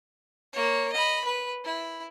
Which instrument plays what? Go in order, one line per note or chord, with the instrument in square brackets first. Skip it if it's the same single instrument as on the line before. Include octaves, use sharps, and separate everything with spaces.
[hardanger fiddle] A#3 C#5
D#5 B5
B4
E4